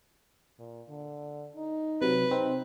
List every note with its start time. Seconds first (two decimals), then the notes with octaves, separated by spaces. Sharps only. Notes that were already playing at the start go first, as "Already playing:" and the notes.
0.59 A#2
0.89 D3
1.56 D#4
2.02 C3 F#3 B4
2.31 C4 D#4